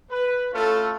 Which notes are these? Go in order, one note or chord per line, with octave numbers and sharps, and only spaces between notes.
B4
A3 C#4 E4 F4 A4